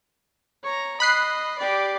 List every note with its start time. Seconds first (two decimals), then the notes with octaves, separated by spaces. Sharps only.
0.63 C#5 A#5
1.00 D#5 B5 F#6 C7
1.58 G4 D5